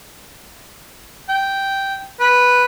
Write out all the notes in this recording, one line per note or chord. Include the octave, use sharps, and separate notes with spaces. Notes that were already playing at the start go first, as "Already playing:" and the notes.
G5
B4